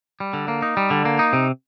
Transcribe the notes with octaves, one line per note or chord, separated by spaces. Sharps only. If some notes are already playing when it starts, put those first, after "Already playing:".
G3
D3
A#3
D#4
G3
D3
A#3
D#4
C3